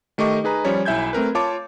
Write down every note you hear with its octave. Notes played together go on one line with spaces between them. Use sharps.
D#3 A3 G4 D#5 C#6 D6
D#4 G#4 B4 A#5
F3 G3 C#4 C#5
B1 E4 E5 G#5 G6 G#6
A3 C4 A#4 B4
F4 C#5 A5 D6